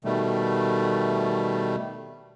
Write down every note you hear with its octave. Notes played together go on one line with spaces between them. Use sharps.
B2 D#3 G3 A3